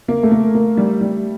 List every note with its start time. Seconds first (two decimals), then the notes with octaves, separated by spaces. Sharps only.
0.08 A#3
0.23 A3
0.31 A#3
0.55 A#3
0.77 G3
1.01 G3